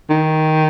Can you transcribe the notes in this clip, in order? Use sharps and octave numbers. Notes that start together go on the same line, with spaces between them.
D#3